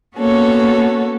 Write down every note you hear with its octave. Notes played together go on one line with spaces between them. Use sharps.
A#3 B3 C#4 F#4 A4 C#5